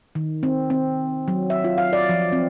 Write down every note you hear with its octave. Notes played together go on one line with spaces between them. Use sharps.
D#3
C4
C4
F#3
E5
F4
F5
D5
F3
C4